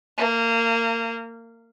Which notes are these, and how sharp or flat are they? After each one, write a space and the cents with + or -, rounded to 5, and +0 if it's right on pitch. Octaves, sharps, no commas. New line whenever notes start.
A#3 -25